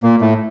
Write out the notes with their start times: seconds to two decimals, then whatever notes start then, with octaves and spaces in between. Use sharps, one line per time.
0.03 A#2 A#3
0.21 A2 A3